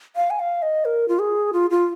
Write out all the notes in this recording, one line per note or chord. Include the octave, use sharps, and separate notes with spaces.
F5
G#5
F5
D#5
A#4
F4
G#4
F4
F4